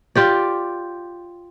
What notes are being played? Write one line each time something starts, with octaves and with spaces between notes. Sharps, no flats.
F4 G4 D5